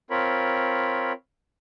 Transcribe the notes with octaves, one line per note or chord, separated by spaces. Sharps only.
C4 F4 A#4 C#5 B5